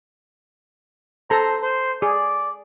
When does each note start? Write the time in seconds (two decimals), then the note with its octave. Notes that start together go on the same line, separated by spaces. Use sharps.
1.30 A4 C5 A#5
1.62 C5
2.02 G#4 D5